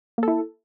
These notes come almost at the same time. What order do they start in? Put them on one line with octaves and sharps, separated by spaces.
A#3 A4 E4